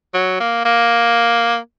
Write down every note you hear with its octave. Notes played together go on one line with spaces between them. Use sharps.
F#3
A#3
A#3